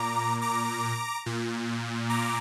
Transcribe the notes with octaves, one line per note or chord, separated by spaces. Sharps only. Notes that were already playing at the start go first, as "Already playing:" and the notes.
Already playing: A#2 A#5 D6
A#5 D6
A#2
A#5 D6